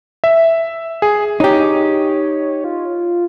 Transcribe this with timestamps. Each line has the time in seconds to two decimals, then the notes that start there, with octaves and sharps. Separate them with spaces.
0.24 E5
1.02 G#4
1.40 D#4 G4 C#5
2.64 F4